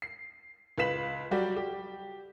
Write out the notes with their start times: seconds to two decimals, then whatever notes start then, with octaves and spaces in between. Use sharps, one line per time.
0.02 C7
0.78 C#2 B4 F5 B6 E7 F#7
1.31 F#3 G3 F#4 G4 D5
1.56 G4